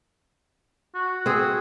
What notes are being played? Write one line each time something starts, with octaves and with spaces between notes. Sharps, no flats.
F#4
C4 G#4